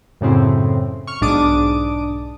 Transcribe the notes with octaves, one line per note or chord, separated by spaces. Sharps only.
F#2 A2 C#3 C4 E4
C#6 F6
B1 G#2 D4 D6 D#6